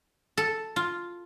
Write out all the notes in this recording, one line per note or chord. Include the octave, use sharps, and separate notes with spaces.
A4
F4